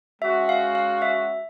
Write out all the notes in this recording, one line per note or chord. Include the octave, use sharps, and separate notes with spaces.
G#3 C#4 F#4 E5
F5
F5
E5